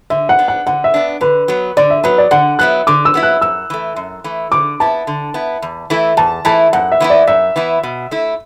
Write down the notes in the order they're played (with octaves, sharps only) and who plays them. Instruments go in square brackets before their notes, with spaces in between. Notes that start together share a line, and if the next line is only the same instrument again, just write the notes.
[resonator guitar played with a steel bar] D3 [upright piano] E5
[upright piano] F#5
[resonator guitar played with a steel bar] B3 D4
[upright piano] F#5
[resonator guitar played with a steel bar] D3 [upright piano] F#5
[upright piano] E5
[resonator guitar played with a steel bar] B3 D4
[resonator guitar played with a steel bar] D3 [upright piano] B4
[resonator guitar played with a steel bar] F#3 B3
[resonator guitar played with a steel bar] D3 [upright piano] D5
[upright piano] E5
[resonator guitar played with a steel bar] F#3 B3 [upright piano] B4
[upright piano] D5
[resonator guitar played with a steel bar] D3 [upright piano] F#5
[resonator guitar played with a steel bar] F#3 B3 E4 [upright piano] F#6
[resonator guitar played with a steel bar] D3 [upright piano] D6
[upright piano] E6
[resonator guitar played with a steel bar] F#3 B3 E4
[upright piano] F#6
[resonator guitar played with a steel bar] F#2 [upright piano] E6
[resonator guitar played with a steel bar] E3 A3
F#2
E3 A3
[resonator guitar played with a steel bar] D3 [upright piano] D6
[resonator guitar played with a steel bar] B3 E4 [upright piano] A5
[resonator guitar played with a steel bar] D3
B3 E4
E2
E3 A3 E4
[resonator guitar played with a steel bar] E2 [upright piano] A5
[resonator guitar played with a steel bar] E3 A3 E4 [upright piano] A5
[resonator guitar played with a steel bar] F#2 [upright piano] F#5
[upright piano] E5
[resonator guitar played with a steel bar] E3 B3 E4
[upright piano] D5
[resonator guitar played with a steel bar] F#2 [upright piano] E5
[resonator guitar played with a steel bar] E3 B3 E4
B2
A3 E4